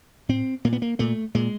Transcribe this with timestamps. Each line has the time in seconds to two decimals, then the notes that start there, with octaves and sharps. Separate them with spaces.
0.29 A2 C4
0.65 A#2 A#3
0.73 B3
0.82 A#3
0.99 A#2 A3
1.35 A#2 G#3